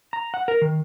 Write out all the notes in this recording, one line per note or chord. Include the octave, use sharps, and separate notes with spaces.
A#5
F#5
A#4
D#3